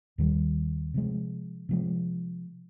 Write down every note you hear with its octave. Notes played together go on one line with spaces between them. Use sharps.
D#2 D#3 G3
C3 F3 G#3
C3 F3 G#3